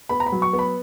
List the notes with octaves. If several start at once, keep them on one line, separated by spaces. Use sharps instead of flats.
B3 B5
A#5
B5
F#3
C#6
B3
B5